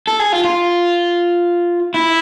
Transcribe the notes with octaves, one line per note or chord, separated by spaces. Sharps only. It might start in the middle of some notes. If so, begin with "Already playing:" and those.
A4
G#4
F4
F4
E4